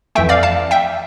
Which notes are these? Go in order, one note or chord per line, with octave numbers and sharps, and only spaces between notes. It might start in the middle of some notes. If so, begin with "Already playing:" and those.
F2 E3 A3 E5 G5
D5 F5
F5 A5
E5 G5